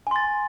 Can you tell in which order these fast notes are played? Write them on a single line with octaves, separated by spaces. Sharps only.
G#5 C6 A6